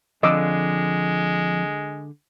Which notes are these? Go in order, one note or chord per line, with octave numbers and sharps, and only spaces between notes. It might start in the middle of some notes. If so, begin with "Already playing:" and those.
F2 D3 G#3 D#5 D6 E6